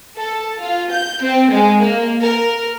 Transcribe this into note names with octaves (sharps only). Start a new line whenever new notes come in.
A4
F4
G6
C4
G#3
A#3
A#4